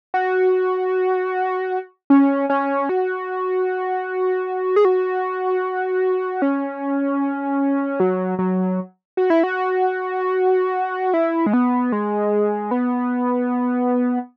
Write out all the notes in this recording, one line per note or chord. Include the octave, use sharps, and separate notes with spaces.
F#4
C#4
C#4
F#4
G#4
F#4
C#4
F#3
F#3
F#4
E4
F#4
E4
G#3
B3
G#3
B3